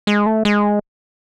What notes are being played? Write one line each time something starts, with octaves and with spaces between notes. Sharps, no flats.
G#3
A3
G#3